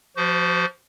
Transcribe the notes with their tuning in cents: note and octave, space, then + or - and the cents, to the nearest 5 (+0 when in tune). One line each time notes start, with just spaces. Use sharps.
F3 +15 F#4 +35 C5 -30